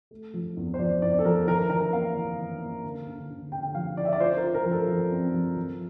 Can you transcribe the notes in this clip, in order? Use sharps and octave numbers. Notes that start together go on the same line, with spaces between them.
A3
F3
E2
C5
F3 D5
E2 D5
A4
F3 A#4
E3 A#4
E3 A#4
A#3 F5
E3
E3
A#3
D3
D3
D3
D3 G5
G5
F3 F5
E4 D5
E5
D5
F4 C5
A#4
F4
A#4
F3
A4
F3
C4
F3
F3